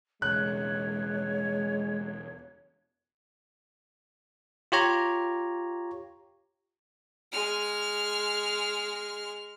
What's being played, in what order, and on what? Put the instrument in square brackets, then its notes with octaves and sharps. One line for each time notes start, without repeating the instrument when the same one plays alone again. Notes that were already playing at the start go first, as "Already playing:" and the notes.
[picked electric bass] E1 C#3 [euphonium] G#3 [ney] C#5 [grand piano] F#6
[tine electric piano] F4 G4 C#5 A#5
[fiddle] G#3 F6